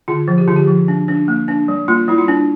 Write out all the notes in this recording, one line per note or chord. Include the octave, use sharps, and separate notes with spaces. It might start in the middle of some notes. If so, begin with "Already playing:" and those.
D3 F4
F3
G4
D3 F4
G4
F3
D4
D4
A#3
D4
G3
A#3 F4
G3 E4
F4
D4